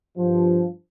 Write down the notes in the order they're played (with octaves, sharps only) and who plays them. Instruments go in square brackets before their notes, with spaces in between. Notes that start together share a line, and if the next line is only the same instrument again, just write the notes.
[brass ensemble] G2 F3